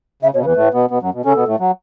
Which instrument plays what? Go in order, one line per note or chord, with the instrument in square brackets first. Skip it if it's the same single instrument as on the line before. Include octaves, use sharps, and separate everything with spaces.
[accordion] C#3 [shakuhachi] E5
[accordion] B2 [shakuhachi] C#5
[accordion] C#3
[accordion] E2 E3 [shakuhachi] B4
[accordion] A2 A3
B2 B3
B2 B3
F#2 F#3
B2
[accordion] C#3 C#4 [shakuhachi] A4
[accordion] B2 B3
A2 A3
F#3